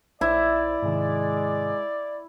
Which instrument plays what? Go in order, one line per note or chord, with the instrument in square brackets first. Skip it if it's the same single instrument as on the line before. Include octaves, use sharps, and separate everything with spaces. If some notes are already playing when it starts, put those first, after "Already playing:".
[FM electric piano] A#1 C5 G#6 [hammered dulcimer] E4 [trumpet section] D5 [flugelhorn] E5
[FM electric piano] G#2 C3 D#3 [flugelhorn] G#3